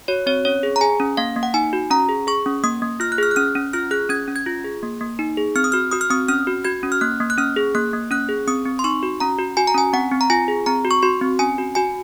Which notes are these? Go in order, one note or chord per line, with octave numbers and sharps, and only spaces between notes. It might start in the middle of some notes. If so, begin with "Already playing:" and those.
F#4 C#5
C4 C#5
C#4 C#5
G#4
A#5
G#4 G#5
C#4
A#3 F5
A#3
F#5
D#4 G#5
F#4
C#4 A#5
G#4
G#4 C#6
C#4
A#3 D#6
A#3
F4 F6
F#6
G#4 F6
F#6
C#4 F6
C#4
F4 F6
G#4 F#6
C#4 G#6
C#4
G#6
F4
G#4
A#3
A#3
D#4
G#4
C4 F6
D#6
F#4 F6
F#4 D#6
F6
C4 D#6
C#4 F6
F#4
F#4 G#6
C#4
F6
A#3 F#6
A#3
F#6
C#4 F6
G#4
A#3 F#6
A#3
C#4 F#6
G#4
C4 D#6
C4
C6
D#4 C#6
F#4
C#4 A#5
F#4
F#4 G#5
A#5
C#4 G#5
C4 F#5
C4
A#5
F4 G#5
G#4
C4 A#5
F#4
C#6
F#4 C6
C4
C#4 G#5
F#4
F#4 G#5